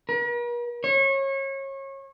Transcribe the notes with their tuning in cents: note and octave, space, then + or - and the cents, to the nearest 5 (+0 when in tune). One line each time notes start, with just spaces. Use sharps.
A#4 +45
C#5 -30